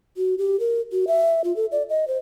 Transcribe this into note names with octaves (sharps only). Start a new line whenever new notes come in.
F#4
G4
A#4
F#4
E5
F4
A4
D5
D#5
C5